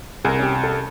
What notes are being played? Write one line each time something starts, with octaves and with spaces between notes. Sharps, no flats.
C2 G#4 A#4
C#4 G4
A4